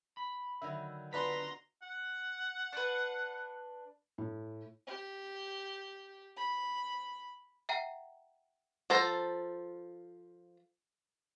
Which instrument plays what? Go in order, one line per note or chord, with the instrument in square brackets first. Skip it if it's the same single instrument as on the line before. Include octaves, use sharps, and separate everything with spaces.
[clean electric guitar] B5
[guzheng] D3 D#3 F#3 [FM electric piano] E5
[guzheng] B3 F4 F#4 [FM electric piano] D4 B4 B6 [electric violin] A#5 C6
[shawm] F#5
[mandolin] D4 B4
[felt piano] A2
[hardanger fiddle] G4
B5
[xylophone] E5 F#5 G5 A#5
[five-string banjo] F3 A4 C5 A#5